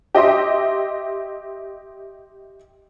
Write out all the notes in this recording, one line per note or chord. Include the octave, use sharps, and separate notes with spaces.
G4 D#5 E5 C6